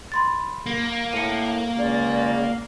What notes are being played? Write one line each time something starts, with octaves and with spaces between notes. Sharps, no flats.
B5 C6 A6
A#3
A2 C#7 D#7
C#2 D5